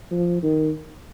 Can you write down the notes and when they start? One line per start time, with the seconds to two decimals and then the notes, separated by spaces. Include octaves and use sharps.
0.11 F3
0.43 D#3